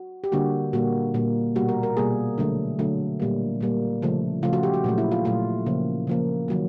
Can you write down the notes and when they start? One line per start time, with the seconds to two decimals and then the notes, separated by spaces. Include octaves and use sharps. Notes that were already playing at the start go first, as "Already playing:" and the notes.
Already playing: F#4
0.24 G4
0.32 D3 G3 A#3 F#4
0.73 A#2 G3 A#3 F#4
1.14 A#2 G3 A#3
1.55 B2 G3 A#3 F#4
1.69 A#4
1.83 A#4
1.97 B2 G3 A#3 G#4
2.38 D3 F#3 A3
2.79 D3 F#3 A3
3.20 A#2 G3 A#3
3.61 A#2 G3 A#3
4.02 C#3 F3 A3
4.43 C#3 F3 A3 F4
4.53 F#4
4.63 G4
4.74 F#4
4.84 A#2 F#3 A3
4.98 E4
5.12 F4
5.25 A#2 F#3 A3 F4
5.66 C#3 F3 A#3
6.07 C#3 F3 A#3
6.48 D#3 F#3 A#3